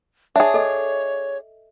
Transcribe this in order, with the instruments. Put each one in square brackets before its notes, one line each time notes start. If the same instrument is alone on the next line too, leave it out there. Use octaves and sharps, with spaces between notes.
[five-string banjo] D4 G#4 [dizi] C#5 [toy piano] E5
[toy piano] A4 D#5